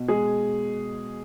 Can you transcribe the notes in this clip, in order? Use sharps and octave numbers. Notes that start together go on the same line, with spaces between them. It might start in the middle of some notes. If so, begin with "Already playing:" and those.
Already playing: B2
G#3 G#4